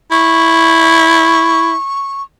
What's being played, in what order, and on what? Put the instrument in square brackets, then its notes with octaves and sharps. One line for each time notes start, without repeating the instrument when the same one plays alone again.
[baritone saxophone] E4 [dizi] C#6